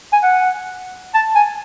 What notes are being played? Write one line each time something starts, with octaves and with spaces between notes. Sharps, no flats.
G#5
F#5
A5
G#5